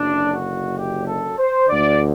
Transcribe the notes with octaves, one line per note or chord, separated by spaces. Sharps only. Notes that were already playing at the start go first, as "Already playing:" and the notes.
Already playing: F#1 F#2 D3 D4
F#4
G4
A4
C5
D2 D3 D5